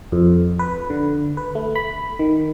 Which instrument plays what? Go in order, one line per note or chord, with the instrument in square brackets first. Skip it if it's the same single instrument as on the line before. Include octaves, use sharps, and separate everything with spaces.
[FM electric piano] F2
B4
D3
B4
A3
B5
D#3